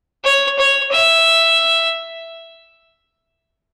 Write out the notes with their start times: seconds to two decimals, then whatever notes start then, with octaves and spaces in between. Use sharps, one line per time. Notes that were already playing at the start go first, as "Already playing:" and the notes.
0.24 C#5
0.58 C#5
0.92 E5